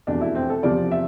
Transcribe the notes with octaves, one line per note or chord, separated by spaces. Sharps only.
F1 E2 B2 D4
E4
C4
A4
E2 C3 F3 D5
E5